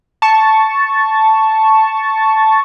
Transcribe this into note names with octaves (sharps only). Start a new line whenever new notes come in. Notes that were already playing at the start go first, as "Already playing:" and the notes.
A5 C#6